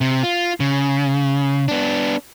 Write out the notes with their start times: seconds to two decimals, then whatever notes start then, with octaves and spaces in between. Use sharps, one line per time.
0.01 C3
0.23 F4
0.60 C#3
1.68 B3 D4